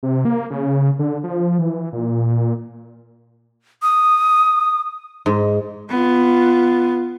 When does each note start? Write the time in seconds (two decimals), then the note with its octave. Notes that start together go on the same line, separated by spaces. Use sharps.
0.03 C3
0.25 A#3
0.51 C#3
0.99 D3
1.24 F3
1.59 E3
1.92 A#2
3.83 D#6
5.26 G#2
5.90 B3 F4